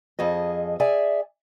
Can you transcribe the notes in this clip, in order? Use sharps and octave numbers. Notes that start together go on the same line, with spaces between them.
F2 G#4 D#5
G#4 D5 E5 G#5